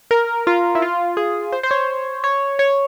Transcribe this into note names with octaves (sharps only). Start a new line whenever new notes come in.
A#4
F4
E4
F4
G#4
C5
C5
C#5
C#5
C#5